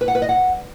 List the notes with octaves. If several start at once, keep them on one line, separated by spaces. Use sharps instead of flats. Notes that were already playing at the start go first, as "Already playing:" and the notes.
B4
F#5
B4
D#5
F#5